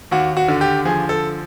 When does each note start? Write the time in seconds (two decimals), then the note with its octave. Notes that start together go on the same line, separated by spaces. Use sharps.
0.11 D#2 F#4
0.37 F#4
0.48 D3
0.61 G4
0.85 F3 G#4
1.09 A4